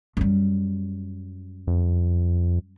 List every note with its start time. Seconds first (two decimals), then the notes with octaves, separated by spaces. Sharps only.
0.17 F#2 G3
1.67 F2